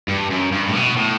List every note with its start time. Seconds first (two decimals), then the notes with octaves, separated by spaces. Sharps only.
0.08 G2
0.30 F#2
0.52 G2
0.68 A2
0.75 B2
0.97 A2